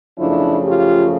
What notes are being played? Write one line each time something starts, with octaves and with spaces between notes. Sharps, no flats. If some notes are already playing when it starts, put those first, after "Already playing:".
F#2 C#3 F3 A3 D4 E4
F4 G4